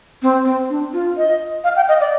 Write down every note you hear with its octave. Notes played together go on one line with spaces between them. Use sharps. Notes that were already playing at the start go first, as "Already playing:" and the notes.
C4
C4
D4
F4
D#5
F5
G5
D#5
D5